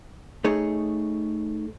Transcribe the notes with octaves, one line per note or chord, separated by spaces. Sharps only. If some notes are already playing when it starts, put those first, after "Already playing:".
A3 D#4 G#4 C#5